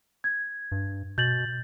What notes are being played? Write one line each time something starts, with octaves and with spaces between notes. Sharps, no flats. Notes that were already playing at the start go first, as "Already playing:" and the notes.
G#6
G2
B2 G6 A6 F#7